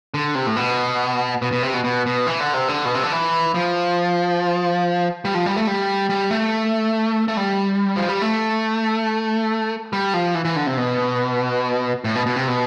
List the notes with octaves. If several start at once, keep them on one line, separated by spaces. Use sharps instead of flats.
D3
C3
A2
B2
B2
B2
C3
B2
B2
B2
E3
D3
C3
D3
B2
C3
D3
E3
F3
G3
F3
G3
A3
G3
G3
A3
A3
G3
F3
G3
A3
G3
F3
E3
E3
D3
C3
B2
A2
B2
B2
C3
B2